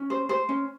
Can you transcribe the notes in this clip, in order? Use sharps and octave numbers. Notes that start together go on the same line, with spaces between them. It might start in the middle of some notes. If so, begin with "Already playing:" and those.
Already playing: C#4
C5
C5
C#4